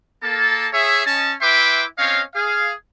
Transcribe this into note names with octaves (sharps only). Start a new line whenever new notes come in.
A#3 A4 A5
G#4 C#5 E5
C#4 D#5 A5
E4 B4 E5 G5 C6 D6
C4 C#4 C#5 D#5 F5
G#4 F5